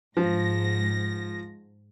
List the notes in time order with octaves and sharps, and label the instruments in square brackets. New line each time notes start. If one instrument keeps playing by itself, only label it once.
[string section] G#2 A#6 [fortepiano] F3